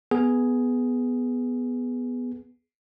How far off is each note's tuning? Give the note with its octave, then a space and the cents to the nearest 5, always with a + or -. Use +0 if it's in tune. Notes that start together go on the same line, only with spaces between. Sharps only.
B3 +0 G#4 +5